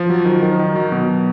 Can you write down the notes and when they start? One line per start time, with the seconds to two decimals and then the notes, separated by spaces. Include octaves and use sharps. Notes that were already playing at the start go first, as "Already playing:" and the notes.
Already playing: F3
0.10 F#3
0.25 D#3
0.43 D#3
0.59 D#3
0.76 F#3
0.92 B2